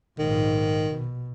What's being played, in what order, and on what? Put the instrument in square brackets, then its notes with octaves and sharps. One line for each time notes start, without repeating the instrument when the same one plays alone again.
[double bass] A#1 G#2 [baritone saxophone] D#3
[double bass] B2